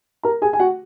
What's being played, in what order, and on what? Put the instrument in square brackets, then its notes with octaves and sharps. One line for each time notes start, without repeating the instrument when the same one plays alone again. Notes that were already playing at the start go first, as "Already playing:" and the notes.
[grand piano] A#4 A#5
G#4 G#5
G#5
F#4 F#5